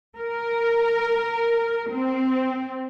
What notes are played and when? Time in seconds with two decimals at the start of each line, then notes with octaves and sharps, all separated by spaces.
0.16 A#4
1.91 C4